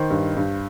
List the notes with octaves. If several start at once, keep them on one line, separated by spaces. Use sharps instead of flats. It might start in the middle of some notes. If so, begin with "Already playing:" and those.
Already playing: D#3 C5
G2
G2